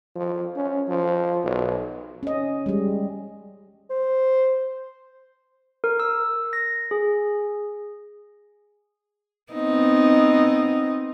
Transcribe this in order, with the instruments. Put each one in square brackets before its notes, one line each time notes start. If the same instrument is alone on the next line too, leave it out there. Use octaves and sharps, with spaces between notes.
[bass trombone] F3
C#4
F3
B1
[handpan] C#4 D#5
G3 G#3
[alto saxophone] C5
[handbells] A#4
E6
A#6
G#4
[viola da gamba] B3 C4 D#4